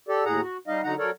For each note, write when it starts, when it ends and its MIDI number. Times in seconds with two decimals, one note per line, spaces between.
0.09 0.24 67
0.09 0.24 69
0.09 0.24 74
0.25 0.41 39
0.25 0.41 45
0.25 0.41 68
0.25 0.41 78
0.25 0.41 82
0.41 0.57 66
0.67 0.81 55
0.67 0.81 63
0.67 0.81 75
0.67 0.81 77
0.84 0.95 50
0.84 0.95 54
0.84 0.95 63
0.84 0.95 78
0.84 0.95 82
0.99 1.10 54
0.99 1.10 69
0.99 1.10 70
0.99 1.10 73
0.99 1.10 74